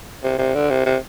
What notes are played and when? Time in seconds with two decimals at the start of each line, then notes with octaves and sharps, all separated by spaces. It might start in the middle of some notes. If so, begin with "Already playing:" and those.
0.24 C3
0.38 C3
0.55 D3
0.70 C3
0.86 C3